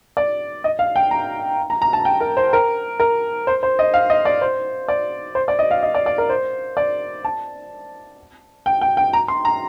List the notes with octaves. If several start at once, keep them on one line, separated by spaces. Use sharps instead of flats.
D5
D#5
F5
G5
A#5
A#5
A#5
A5
G5
A#4
C5
A#4
A#4
C5
C5
D#5
F5
D#5
D5
C5
D5
C5
D5
D#5
F5
D#5
D5
D5
A#4
C5
D5
A5
G5
G5
G5
A#5
C6
A#5